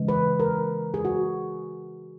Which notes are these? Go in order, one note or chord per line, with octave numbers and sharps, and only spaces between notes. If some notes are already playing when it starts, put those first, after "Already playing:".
Already playing: C#3 E3 G#3
B4
A#4
G#4
F#4